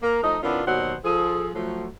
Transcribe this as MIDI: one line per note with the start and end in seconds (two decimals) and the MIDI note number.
0.03 0.21 58
0.03 0.21 70
0.23 0.38 53
0.23 0.38 57
0.23 0.38 63
0.23 0.38 75
0.43 0.63 51
0.43 0.63 59
0.43 0.63 61
0.43 0.63 62
0.43 0.63 64
0.43 0.63 65
0.66 0.95 39
0.66 0.95 47
0.66 0.95 54
0.66 0.95 72
0.66 0.95 74
0.66 0.95 78
1.05 1.50 53
1.05 1.50 68
1.05 1.50 69
1.55 1.87 53
1.55 1.87 54
1.55 1.87 57